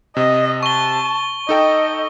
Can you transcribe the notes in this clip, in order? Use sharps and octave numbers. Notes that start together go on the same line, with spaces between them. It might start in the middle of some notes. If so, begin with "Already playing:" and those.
C3 D#5
A5 C#6 G7
D#4 A4 D#5 G5